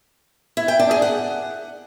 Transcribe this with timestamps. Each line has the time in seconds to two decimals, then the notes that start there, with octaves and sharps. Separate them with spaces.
0.57 E4
0.68 G5
0.79 D4
0.91 G#4
1.02 F#5